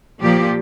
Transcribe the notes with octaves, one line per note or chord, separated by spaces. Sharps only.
A#2 F3 G4